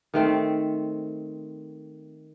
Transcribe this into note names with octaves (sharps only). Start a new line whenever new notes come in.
D#3 A3 C4